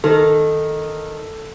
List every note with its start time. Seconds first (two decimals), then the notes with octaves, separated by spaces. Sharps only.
0.04 D#3 A4